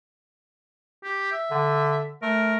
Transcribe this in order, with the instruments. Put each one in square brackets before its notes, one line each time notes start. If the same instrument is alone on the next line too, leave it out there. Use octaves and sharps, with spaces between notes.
[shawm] G4
E5
[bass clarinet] D3
[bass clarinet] A3 [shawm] A#4